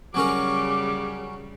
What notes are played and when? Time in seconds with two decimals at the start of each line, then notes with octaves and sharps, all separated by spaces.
0.14 C#3 F#3 G3 C#4 A#4 D6